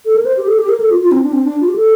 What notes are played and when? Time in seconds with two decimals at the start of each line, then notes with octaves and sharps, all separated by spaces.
0.05 A4
0.16 A#4
0.26 C5
0.37 G4
0.47 A4
0.58 G4
0.69 A#4
0.80 A4
0.91 F4
1.02 F4
1.12 C4
1.23 D4
1.33 C4
1.44 D4
1.60 F4
1.68 G4
1.76 A4